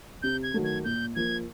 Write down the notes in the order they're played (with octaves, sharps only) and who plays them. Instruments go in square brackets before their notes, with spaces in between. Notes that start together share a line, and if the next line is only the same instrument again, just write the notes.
[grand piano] C3 [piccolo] G6
[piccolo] G#6
[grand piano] D#3 F#3 A3
[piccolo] G#6
[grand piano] A#2 [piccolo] G6
[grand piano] F3 A#3 [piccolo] G#6